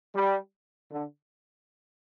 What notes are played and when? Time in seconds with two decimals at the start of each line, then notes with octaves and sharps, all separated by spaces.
0.14 G3
0.91 D3